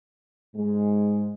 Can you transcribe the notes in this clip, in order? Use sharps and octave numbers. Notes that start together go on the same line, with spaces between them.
G#2 G#3